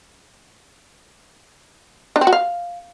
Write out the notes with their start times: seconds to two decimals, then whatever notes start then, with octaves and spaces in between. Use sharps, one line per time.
2.16 D4
2.21 C4
2.27 F#4
2.33 F5